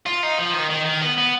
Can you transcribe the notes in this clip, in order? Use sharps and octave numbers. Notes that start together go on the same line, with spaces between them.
F4
D#4
F3
D#3
D#3
D#3
B3
B3